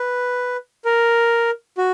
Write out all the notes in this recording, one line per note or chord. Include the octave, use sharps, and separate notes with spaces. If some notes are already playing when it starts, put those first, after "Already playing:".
Already playing: B4
A#4
F#4